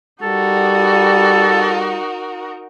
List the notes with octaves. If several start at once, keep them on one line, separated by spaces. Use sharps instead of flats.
G3 D#4 F#4 A4 A#4